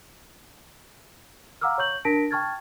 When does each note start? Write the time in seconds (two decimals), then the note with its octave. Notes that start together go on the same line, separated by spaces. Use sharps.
1.61 F5 F#5 A#5 D6 E6 F6
1.78 C#5 C#6 G6 F#7
2.05 D4 A#4 A5 A#6 B6 D7
2.31 G5 A5 C#6 F6 G#6 A6